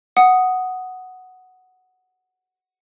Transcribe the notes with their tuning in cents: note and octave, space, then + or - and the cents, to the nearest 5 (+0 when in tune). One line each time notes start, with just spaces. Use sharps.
F#5 +0 D#6 +0